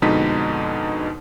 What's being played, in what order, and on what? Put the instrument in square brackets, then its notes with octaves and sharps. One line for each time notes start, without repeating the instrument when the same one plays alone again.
[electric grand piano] F2 B2 D3 G#3 D#4 B6